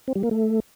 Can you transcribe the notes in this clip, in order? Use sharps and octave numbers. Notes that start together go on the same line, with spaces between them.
C4
G3
A#3
A3